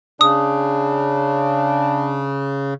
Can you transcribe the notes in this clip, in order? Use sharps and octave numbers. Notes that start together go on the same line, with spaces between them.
C#3 D4 D#6